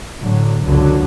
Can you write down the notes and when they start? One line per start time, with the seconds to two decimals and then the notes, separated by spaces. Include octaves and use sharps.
0.21 A2 D3 F#3
0.62 G1 C#2 F#2 D3 F#3